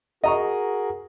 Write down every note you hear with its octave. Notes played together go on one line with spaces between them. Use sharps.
F#4 G#4 A#4 D#5 A#5 C#6